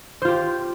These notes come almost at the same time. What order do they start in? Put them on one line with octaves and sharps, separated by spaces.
C5 F4 G4